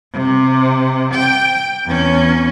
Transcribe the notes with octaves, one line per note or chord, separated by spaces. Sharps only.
C3
G5
E2 C#4